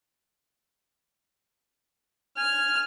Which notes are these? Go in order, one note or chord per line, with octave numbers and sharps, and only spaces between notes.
G#5 F6